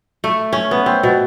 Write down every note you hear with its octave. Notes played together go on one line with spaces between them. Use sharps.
A3
C#4
B3
C4
B2